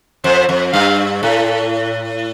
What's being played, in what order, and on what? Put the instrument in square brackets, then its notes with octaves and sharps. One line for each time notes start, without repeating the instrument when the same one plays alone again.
[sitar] F2 [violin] C5
[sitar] F2
[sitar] G2 [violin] F5
[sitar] A2 [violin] A4